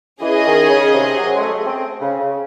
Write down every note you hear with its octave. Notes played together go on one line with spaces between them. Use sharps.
E3 C#4 G#4 D#5
D#3
C#3
C3
F#3
G#3
A3
C4
C#3
C#3